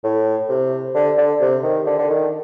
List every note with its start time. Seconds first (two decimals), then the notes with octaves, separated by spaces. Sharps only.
0.04 A2
0.49 C3
0.95 D3
1.18 D3
1.41 C3
1.63 D#3
1.86 D3
1.99 D3
2.10 D#3